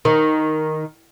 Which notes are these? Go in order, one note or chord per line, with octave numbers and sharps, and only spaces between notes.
D#3